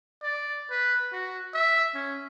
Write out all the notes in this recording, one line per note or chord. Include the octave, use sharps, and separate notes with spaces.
D5
B4
F#4
E5
C#4